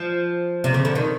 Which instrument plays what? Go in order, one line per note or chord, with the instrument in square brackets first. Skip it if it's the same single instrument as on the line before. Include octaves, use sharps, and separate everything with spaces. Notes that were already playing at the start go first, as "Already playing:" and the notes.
Already playing: [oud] F3
C3
C#3
D3
D#3